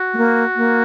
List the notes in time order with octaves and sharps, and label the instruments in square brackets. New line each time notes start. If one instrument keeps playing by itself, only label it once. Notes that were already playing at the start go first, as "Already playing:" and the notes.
Already playing: [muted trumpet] F#4
[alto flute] A3
A#3
A#3